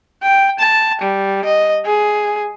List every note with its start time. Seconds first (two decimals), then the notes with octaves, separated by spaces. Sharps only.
0.23 G5
0.59 A5
1.01 G3
1.45 D#5
1.85 G#4